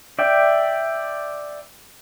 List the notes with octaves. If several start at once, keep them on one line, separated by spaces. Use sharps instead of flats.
D5 E5 G5